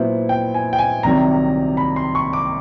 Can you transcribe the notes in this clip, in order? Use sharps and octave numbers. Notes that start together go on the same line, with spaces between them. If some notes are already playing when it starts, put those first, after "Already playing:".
Already playing: A#2 F#3 B3 E4 C5
G5
G#5
G5
G#5
C2 C3 D#3 F#3 A#5
B5
C6
C#6
D6